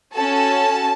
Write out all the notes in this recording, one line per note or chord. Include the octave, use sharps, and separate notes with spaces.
C#4 F#4 A4 A5